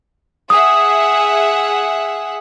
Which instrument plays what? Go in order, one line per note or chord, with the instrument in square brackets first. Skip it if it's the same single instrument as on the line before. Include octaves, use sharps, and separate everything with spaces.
[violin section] G#4 E5 F#5 [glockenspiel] D#6